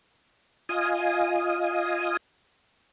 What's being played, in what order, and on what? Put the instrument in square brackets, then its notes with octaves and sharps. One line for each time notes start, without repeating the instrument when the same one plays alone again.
[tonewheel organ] F4 D#5 F5 G#5 D#6